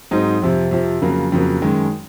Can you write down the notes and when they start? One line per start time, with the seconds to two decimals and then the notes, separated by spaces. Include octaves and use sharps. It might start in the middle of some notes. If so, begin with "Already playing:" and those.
0.11 G#2 F#3 C4 D#4
0.42 F2 C3 F3
0.71 F2 C3 F3
1.02 F2 C#3 F#3 A#3
1.32 F2 C#3 F#3 A#3
1.62 F#2 D#3 G#3